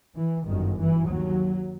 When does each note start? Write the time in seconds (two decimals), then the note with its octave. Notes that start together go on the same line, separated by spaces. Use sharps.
0.16 E3
0.47 G1 F#2 D#3
0.78 E3
1.09 D#2 F#3